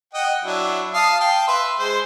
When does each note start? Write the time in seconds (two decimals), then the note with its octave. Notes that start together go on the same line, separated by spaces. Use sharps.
0.14 D#5 F#5 G5
0.44 F#3 D4 E4
0.94 F5 A5 D#6
1.20 F5 G5 A5
1.48 B4 E5 C6
1.79 G#3 C5